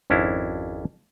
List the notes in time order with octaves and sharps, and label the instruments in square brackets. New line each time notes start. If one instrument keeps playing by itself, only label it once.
[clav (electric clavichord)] G#1 F2 C#4 D4 E4 F5